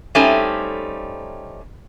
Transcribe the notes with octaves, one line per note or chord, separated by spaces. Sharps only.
G3 A3 C4 C#4 D#4